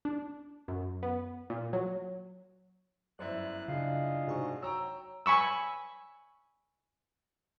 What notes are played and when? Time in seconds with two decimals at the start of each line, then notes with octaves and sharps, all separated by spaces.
0.05 D4
0.68 F#2
1.03 B3
1.50 A#2
1.73 F#3
3.19 G1 F#2 E4 C5 D5 F#6
3.68 C#3 D4 F4 G#4 D#5
4.28 G#2 C3 F#4 C#6
4.62 F#3 G5 A#5 C#6 E6
5.26 G#5 B5 C#6 E6